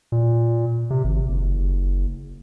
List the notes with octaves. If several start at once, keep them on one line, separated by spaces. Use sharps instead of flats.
A#2
C3
G#1
F#1